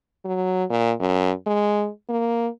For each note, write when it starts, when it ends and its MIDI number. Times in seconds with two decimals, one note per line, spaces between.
0.25 0.64 54
0.70 0.92 46
1.00 1.31 42
1.46 1.89 56
2.09 2.48 58